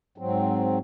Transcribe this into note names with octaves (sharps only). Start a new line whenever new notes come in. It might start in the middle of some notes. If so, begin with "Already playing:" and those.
G#2 F#3 C4